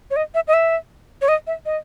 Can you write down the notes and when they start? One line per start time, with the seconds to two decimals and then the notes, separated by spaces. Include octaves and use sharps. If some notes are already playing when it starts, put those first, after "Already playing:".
0.11 C#5
0.16 D#5
0.35 E5
0.48 D#5
0.53 E5
1.22 C#5
1.28 D#5
1.47 E5
1.66 D#5